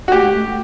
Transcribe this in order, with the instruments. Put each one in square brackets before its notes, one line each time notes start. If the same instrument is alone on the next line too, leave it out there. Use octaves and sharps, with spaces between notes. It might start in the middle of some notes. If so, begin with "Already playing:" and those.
[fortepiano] F#4
[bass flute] A3 [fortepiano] G4
[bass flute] G#3
A3